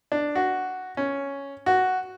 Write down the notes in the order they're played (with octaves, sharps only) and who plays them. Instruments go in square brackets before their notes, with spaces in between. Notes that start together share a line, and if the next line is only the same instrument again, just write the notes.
[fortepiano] D4
F#4
C#4
F#4